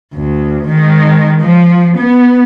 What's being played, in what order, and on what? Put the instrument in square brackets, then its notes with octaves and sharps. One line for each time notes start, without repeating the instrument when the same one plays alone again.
[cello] D2
D#3 G#3
F3
B3